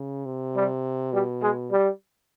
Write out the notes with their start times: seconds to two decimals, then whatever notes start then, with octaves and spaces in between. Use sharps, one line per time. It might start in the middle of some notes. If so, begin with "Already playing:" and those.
Already playing: C#3
0.25 C3
0.55 G3
1.12 B2 G3
1.41 G#3
1.69 G3